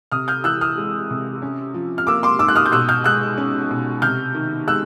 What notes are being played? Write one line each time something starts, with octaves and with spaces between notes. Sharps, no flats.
C3 D#6 F6
F6 G6
E3 E6 F#6
D#6 F6
G#3
C3
C#4
F3
F6
A#3 D6 E6
C6 D6
G#2 D6 E6
F#6
D#6 F6
G6
B2 E6 F#6
F6 G6
G#3 E6 F#6
C#4
B2
C3 F6 G6
D#3
G#3 E6 F#6